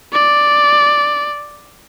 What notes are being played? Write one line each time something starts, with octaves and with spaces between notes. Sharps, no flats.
D5